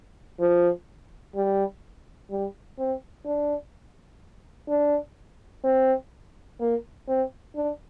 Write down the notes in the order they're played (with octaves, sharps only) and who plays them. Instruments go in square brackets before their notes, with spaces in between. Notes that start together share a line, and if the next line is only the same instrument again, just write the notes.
[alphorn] F3
G3
G3
C4
D4
D4
C4
A#3
C4
D4